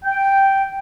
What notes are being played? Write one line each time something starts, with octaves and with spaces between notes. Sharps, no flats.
G5